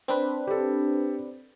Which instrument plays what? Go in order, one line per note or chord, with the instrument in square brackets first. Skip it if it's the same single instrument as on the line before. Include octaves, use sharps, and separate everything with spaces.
[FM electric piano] C4 D4 B4
[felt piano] G4 A4